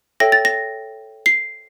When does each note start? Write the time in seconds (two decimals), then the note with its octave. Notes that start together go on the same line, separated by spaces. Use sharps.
0.20 A4 C#5 E5 G5 A#6
0.32 A6
0.45 A#6
1.26 C7